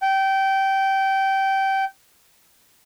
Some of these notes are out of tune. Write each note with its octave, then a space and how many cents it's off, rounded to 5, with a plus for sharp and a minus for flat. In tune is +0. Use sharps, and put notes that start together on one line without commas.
G5 -20